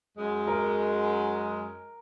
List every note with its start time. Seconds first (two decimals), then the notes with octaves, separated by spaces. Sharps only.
0.17 F#2 G#3
0.47 A#4